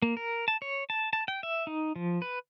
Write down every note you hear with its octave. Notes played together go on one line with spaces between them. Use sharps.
A#3
A#4
A5
C#5
A5
A5
G5
E5
D#4
F3
B4